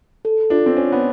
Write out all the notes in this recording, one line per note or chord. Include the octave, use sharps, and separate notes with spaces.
A4
D4 F4
C4
C#4 C#5
B3